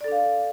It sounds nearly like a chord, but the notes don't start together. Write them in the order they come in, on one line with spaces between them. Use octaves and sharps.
D5 A4 D4 F5